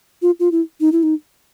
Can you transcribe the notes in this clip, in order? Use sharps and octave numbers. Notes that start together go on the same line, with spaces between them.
F4
F4
E4
D#4
E4
D#4